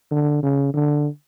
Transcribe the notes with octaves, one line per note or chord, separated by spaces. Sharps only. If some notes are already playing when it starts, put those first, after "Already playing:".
D3
C#3
D3